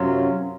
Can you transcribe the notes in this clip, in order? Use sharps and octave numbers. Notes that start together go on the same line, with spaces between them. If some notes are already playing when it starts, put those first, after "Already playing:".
Already playing: F#2 C3 F#3 C#4 F4